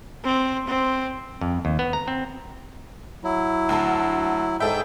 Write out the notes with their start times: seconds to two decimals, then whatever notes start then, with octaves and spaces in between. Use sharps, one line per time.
0.24 C4
0.68 C4
1.41 F2
1.65 D#2
1.79 B3
1.93 A#5
2.08 C4
3.24 F#3 E4
3.69 D2 A5
4.60 G#2 G#4 A4 E5 G5 G6